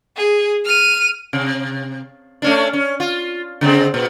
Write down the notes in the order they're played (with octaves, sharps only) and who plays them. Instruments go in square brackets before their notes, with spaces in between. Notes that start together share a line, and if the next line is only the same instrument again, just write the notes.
[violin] G#4
F6 D#7
[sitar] C3
A3 C#4 D4
C#4
F4
C#3 G#3 C4
A#2